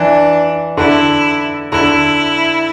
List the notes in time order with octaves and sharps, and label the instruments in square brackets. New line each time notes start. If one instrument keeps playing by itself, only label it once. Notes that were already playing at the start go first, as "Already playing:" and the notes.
Already playing: [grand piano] E3 [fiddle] D4
[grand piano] D3 [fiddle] E4
[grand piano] D3 [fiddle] E4